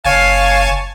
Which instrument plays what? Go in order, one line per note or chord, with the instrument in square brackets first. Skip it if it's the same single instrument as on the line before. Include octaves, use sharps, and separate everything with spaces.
[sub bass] F#1 [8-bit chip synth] C#5 G#5 A5 [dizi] F5